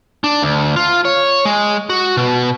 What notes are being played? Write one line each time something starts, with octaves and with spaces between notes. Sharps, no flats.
D4
D2
F4
C#5
G#3
F#4
B2